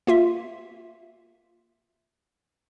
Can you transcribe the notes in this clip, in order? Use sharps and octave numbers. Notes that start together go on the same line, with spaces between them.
A#3 F4 E5